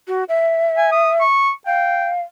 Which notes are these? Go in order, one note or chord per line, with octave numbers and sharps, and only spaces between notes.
F#4
E5
G#5
D#6
C#6
F5 G5